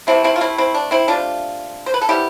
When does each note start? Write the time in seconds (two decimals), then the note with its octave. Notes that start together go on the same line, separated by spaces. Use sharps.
0.07 C3 E3 A3 C4 E4
0.24 C4 E4
0.36 F4
0.41 C4 E4
0.58 C4 E4
0.74 D4
0.91 C4 E4
1.08 E3 A3 D4 F4
1.13 C3
1.86 C5
1.94 B4
2.02 A4
2.09 C3 G3 B3 E4 G4